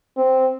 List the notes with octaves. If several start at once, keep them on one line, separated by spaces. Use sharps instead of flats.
C4